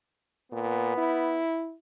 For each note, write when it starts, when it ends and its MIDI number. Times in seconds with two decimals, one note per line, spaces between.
0.52 0.97 46
0.52 1.42 59
0.97 1.74 64